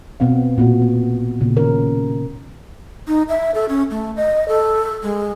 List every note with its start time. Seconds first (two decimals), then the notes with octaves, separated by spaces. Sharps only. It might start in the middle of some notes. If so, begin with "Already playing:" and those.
0.20 B2 B3 C4 F5
0.58 A#2 B3 F#4
0.82 B3
1.41 A#2 C#3
1.56 D#3 C#4 A#4
3.08 D#4
3.29 E5
3.55 A4
3.69 C#4
3.91 A3
4.17 D#5
4.48 A4
5.03 G#3